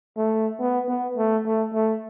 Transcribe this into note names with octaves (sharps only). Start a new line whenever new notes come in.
A3
B3
B3
A3
A3
A3